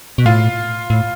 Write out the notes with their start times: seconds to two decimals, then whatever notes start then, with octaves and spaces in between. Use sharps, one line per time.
0.18 B2
0.26 A2 F4
0.90 A2